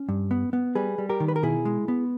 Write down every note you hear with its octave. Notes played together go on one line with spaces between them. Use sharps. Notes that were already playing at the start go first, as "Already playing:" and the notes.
Already playing: C#4
G2
B3
B3
G3 G#4 B4
G3
G4 A#4
D#3
B4
A#4
B2 E4 G#4
G#3
B3